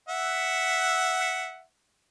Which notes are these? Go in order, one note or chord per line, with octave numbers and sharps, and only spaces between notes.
E5 F#5